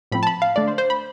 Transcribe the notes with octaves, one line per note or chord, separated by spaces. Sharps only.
A2 F3 C4 B5
A5
B5
F5
D3 A3 D4 D5
C5
C5
B5